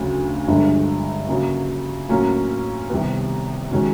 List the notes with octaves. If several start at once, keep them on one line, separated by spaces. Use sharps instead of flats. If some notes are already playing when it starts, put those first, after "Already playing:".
Already playing: D2 C#3 F#3
G1 G2 D3 F3 G#3
C#3 F#3 A#3
A2 F#3 A#3 C#4 F4
C2 C3 D#3 G3 B3
D#3 G#3 C#4 F#4